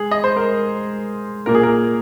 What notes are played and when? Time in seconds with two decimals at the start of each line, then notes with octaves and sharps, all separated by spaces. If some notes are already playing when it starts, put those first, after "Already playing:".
Already playing: G#3 G#4
0.11 D#5
0.24 C5
0.36 A#4
1.46 A#2 A#3 A#4
1.54 G#4
1.63 A#4